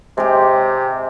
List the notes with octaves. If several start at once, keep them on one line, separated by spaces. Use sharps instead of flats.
C3 G#3 G4